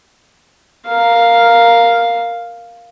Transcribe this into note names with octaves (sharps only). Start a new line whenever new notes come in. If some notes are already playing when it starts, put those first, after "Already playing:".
A#4 F5